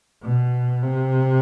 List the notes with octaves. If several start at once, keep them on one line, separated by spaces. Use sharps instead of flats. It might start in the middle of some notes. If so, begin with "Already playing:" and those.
B2
C3